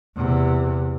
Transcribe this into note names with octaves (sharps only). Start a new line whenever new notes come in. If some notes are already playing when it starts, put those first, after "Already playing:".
E2 C3